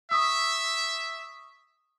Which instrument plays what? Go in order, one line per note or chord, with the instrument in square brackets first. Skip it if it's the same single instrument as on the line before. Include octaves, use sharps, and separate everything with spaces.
[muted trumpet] E5 [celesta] C#6 D#6 E6